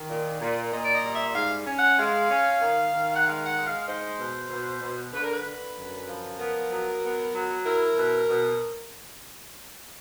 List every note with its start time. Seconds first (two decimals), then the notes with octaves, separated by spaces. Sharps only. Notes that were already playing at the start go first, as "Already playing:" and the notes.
Already playing: D#3
0.10 A#2
0.41 A#2
0.73 A#2 D#5
0.85 D5
0.94 D#5
1.04 G3
1.15 E5
1.35 G#2 F5
1.67 C#4
1.77 F#5
1.99 G#3 F5
2.30 C#4
2.62 D#3
2.94 D#3
3.14 F#5
3.25 G#3 F5
3.46 F#5
3.56 G#3
3.66 F5
3.88 D#4 C5
4.20 B2
4.50 B2
4.82 B2
5.13 D3 B4
5.23 A#4
5.33 B4
5.45 D3
5.77 F#2
6.08 F3
6.39 B3 A#4
6.71 F#3
7.02 B3
7.33 F#3
7.65 E4 A#4
7.97 B2
8.29 B2